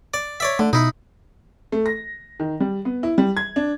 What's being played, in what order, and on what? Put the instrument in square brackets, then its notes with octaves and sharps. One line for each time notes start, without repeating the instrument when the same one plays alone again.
[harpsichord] D5
C#5 D5 E5
[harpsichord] D3 [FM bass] A3
[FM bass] B2 [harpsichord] D#4 E4
[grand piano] A3
A#6
D#3
G3
B3
E4
G3
G#6
D4